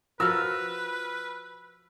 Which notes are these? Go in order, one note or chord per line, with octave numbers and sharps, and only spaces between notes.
F3 F#4 A#4 B4 E6 F6